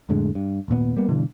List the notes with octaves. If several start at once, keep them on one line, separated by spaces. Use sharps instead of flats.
F2 A2 D3 G#3
G2
D#1 G#1 A#2 B3
G3 A#3 B3
G2 B2 D3 E3